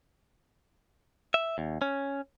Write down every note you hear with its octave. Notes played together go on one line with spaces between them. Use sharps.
E5
D#2
C#4